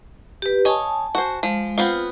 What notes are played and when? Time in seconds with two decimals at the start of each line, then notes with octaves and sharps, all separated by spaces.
0.42 G4 B4
0.65 C#5 D#5 G#5 A5
1.15 F#4 C5
1.43 F3 G#3
1.78 B3 C4 F4 F5